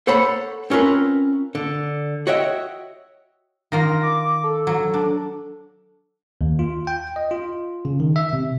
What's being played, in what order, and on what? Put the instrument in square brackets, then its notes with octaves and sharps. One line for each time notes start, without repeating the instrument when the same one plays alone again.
[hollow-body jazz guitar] A4 C5 C#5 F#5 B5
C4 C#4 F4 A#4 B4
D3
F#4 C#5 D#5 E5 F#5 G5
[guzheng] D#3 A#3 F4 [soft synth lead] A#6
[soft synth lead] D6
A4
[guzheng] F#3
D4
[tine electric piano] D#2
F4
G5
D#5
F4
C#3
D#3
E5
C3